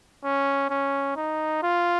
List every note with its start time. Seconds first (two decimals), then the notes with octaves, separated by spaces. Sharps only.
0.24 C#4
0.70 C#4
1.16 D#4
1.63 F4